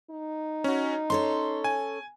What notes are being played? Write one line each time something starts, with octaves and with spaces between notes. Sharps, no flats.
D#4
C#4 F#4
C#4 A4 C#5 C6
G#5